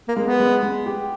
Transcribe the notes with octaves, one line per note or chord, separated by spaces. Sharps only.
A#3
G#3
B3
G#3
G#3
G4